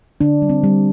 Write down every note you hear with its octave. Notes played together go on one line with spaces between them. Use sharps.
D3 D4
G3
C4
G3